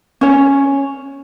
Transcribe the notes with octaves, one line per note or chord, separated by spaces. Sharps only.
C#4 C#5